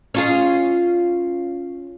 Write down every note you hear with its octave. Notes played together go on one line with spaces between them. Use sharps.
C#4 F4 G#4